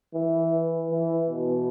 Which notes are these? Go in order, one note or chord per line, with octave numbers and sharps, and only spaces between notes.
E3
E3
B2